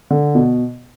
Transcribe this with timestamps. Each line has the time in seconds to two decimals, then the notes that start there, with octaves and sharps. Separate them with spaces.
0.10 D3
0.35 B2